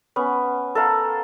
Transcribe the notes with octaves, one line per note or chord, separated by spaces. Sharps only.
B3 C#4
A4 A#4 F5 F#5